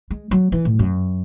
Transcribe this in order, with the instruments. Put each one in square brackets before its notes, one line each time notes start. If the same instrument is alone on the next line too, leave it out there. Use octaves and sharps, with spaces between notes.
[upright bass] G#3
F#3
E3
A2
F#2